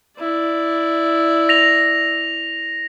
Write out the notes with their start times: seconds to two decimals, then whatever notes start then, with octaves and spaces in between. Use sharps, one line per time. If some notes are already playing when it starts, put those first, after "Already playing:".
0.19 E4 D5
1.49 A#6 F7